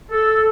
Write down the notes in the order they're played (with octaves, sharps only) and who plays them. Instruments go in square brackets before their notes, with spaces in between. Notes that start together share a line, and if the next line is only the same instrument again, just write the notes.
[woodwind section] A4